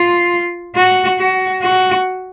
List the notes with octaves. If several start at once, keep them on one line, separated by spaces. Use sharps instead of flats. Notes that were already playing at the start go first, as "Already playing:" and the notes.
Already playing: F4
F#4
F#4
F#4